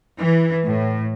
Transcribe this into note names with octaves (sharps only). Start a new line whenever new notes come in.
E3
A2